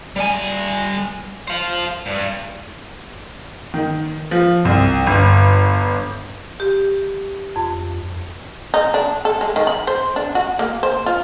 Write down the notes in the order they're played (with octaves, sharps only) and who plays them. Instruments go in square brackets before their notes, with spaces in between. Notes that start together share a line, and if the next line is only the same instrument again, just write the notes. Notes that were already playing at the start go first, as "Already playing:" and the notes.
[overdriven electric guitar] G3 G#5
C5 F5
G2
[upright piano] D#3
F3
C2
G1
[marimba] G4
F2
[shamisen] D#4
D4
A4
G#3
D#3
B5
C5
D4
F#4
A#3
C5
F4